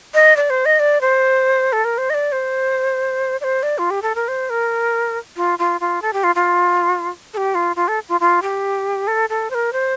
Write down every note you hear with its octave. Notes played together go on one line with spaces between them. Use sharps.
D#5
D5
C5
D#5
D5
C5
A4
A#4
C5
D#5
D5
C5
D5
C5
D5
F4
G4
A4
A#4
C5
A#4
F4
F4
F4
A4
G4
F4
F4
A4
G4
F4
F4
A4
F4
F4
G4
A4
A4
C5
A#4
C5